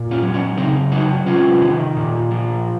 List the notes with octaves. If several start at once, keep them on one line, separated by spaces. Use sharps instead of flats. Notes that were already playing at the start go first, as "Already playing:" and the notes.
Already playing: A#2
C#4 F4
F#3
C#4
C#3 C4 D#4
F#3 D#4 F#4
C3 C#4 F4
D#3
A#2
F3